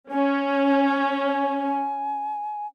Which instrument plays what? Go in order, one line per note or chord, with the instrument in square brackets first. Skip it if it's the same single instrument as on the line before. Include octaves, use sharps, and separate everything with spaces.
[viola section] C#4 [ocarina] G#5